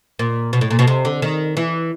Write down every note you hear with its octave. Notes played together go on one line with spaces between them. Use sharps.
A#2
B2
A2
A#2
B2
C3
D3
D#3
E3